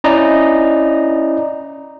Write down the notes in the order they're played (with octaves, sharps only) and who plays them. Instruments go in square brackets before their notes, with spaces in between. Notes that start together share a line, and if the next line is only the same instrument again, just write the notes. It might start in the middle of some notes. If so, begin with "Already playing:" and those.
[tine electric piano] C#4 E4 D5 D#5 A#5